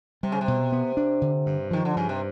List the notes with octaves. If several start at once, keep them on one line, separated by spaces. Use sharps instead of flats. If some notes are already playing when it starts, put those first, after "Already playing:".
C3 G3
C#3
C3
B2
B3
D4
D3
G2
D#3 F3
D3
G2 C#3
C3